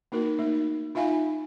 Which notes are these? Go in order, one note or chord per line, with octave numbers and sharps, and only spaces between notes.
A#3 D#4 F#4 A#4
A3 D#4
D#4 F4 E5 F5 G#5 B5